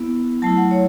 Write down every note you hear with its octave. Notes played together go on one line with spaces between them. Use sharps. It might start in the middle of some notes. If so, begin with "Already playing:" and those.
Already playing: B3 E4
F#3 A3 E4 A5
F#5
C#5